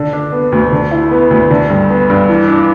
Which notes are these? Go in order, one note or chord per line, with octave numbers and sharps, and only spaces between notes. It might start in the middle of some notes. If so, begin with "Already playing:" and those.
Already playing: D3
D4
B3
D2
D3
E4
B3
D2
D3
G2
B3
G2
E3
D4